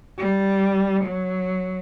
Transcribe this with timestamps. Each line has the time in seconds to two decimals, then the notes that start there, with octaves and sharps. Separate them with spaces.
0.18 G3
1.05 F#3